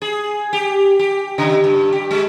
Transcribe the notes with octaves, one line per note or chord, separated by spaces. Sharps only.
G#4
G4
G4
C#3
G2
G4
G#3